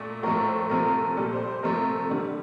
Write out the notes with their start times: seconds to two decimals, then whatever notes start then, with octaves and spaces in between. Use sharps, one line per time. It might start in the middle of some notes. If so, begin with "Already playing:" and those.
Already playing: A#2 A3
0.23 A2 F3 A3 A#4
0.47 C5
0.70 C3 F3 A3 A#4
1.17 A#2 G3 A4
1.33 C5
1.48 C5
1.63 C3 F3 A3 A#4
2.10 D3 G3